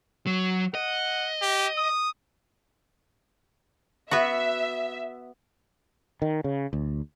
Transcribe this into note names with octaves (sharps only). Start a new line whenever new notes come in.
F#3
D#5 F#5
G4
D#6
B3 F#4 E5
D#3
C#3
D2